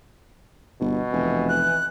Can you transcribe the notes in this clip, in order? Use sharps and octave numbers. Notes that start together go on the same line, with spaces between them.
G1 B2
F1 E3
F#6